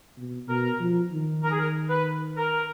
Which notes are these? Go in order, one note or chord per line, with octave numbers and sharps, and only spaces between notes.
B2
B2 A#4
F3
D#3
A#4
G#4
A#4
B4
A#4